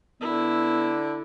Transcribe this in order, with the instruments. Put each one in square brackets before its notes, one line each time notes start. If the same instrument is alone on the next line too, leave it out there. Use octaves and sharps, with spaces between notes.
[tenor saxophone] D3 [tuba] B3 [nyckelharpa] E4